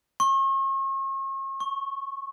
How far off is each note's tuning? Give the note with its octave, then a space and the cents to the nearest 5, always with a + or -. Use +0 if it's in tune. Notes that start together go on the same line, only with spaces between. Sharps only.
C#6 -40
C#6 -10